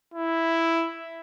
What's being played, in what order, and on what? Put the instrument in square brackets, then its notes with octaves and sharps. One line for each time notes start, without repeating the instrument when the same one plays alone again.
[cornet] E4